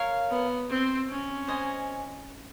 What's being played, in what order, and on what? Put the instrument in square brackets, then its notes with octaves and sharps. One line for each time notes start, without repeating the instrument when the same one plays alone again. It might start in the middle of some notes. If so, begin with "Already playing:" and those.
Already playing: [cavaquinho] A#4 C#5 F5
[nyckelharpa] B3
C4
C#4
[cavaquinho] C5 D#5 G#5